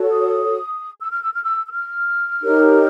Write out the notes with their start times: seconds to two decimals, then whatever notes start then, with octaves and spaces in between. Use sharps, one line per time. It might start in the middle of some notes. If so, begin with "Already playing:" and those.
Already playing: F#4 A4 C#5
0.11 D#6
0.99 E6
1.11 F6
1.22 E6
1.33 F6
1.44 E6
1.66 E6
1.71 F6
2.41 D#4 G4 A#4 C#5